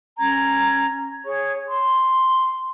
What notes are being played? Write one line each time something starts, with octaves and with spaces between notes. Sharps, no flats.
C#4 A#5 G#6
G#4 C#5 C#6
C6